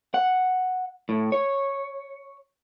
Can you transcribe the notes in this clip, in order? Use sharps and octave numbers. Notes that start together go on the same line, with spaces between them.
F#5
A2
C#5